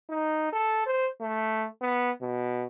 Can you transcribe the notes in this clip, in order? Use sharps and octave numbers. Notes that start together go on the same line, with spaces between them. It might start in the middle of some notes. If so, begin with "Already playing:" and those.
D#4
A4
C5
A3
B3
B2